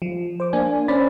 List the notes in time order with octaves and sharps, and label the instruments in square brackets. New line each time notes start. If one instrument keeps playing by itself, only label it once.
[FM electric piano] F3
C5 D6
A#3 D4 G#5
C#4 D4 C5 D5 B5 A6